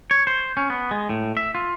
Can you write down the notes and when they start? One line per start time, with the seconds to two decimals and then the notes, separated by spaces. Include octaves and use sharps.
0.11 C#5
0.27 C5
0.57 C#4
0.70 B3
0.91 G#3
1.09 A2
1.37 E5
1.55 F4